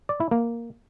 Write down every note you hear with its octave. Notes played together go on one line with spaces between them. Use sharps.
D5
E4
A#3